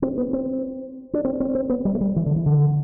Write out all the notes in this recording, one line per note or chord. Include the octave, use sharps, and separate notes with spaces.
C4
B3
C4
D4
C4
C4
C4
B3
G3
A3
G3
E3
D3
E3
D3